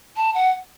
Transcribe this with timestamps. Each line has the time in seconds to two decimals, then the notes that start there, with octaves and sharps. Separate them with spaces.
0.16 A5
0.34 F#5